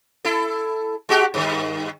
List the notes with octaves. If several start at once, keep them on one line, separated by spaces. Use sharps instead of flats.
E4 A4
G#3 F#4 G4
G2 D#3